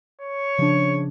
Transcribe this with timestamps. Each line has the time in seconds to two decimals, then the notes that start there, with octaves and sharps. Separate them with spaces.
0.21 C#5
0.58 C#3 F3 D4